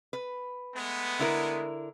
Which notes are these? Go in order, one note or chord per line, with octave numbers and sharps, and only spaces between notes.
B4
G#3 A3 B3
D3 E4 A#4